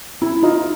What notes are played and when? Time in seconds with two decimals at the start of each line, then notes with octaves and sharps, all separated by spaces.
0.22 E4
0.43 D#4 F4